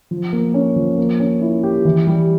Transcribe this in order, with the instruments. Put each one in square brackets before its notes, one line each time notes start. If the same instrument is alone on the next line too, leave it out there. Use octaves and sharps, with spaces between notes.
[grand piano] F3
A#3
C#4
F3
A#3
C#4
E4
G4
E3
G3